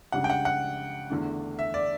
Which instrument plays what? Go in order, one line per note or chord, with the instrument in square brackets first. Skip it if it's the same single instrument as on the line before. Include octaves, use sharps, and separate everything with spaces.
[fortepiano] C#2 C#3 G3 D4 [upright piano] F#5
[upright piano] G5
F#5
F#5
[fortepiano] E2 D3 A3 D4
[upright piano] E5
D5